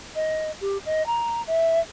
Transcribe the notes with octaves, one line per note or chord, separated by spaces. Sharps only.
D#5
G4
D#5
A#5
E5